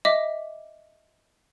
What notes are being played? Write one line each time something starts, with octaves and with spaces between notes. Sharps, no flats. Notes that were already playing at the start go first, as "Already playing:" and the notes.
D#5 E5 D6